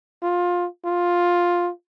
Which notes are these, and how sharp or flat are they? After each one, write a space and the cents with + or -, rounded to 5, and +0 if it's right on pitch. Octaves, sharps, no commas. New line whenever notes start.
F4 +20
F4 +10